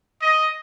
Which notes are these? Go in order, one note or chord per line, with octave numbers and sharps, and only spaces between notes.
D#5